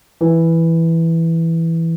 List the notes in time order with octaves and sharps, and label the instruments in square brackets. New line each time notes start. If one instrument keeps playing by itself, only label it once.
[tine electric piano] E3